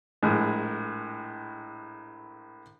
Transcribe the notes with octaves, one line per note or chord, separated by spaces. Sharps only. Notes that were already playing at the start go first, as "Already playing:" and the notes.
A#1 A2 G#3